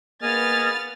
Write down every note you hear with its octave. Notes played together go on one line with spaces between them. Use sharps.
A#3 B3 G#4 D#5 G#5 F6 A6